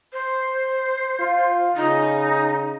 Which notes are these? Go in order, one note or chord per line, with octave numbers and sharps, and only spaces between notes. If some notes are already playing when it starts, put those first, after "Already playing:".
C5
F4
C#3 D#4